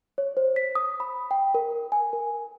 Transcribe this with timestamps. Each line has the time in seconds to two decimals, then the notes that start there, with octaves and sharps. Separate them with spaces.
0.18 C#5
0.37 C5
0.56 B6
0.75 D#6
1.00 B5
1.31 G5
1.54 A#4
1.92 G#5
2.13 A#4